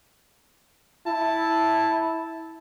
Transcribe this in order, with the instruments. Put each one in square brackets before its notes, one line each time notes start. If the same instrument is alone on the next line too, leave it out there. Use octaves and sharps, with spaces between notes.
[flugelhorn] E4 [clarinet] A5